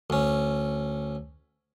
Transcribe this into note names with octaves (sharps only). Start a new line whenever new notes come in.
D2 C#4